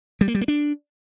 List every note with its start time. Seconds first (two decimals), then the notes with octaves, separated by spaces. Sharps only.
0.21 G3
0.28 A#3
0.35 G3
0.41 A#3
0.48 D4